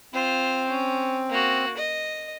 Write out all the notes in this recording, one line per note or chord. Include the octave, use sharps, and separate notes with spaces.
C4 F4 C5
C#4
A#3 F#4
D#5